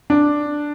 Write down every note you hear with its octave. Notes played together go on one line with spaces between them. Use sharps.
D4